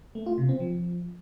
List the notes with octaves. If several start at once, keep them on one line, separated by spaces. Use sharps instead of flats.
A3
F4
C3
C4
F3